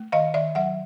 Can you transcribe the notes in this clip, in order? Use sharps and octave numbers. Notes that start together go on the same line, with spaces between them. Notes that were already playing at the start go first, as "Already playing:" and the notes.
Already playing: A3
D#3 D#5 F5
D#3 D5 E5
F#3 E5 F#5